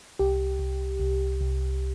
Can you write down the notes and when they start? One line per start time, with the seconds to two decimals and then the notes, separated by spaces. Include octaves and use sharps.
0.19 C2 G4
0.59 C2
1.00 C2
1.41 C2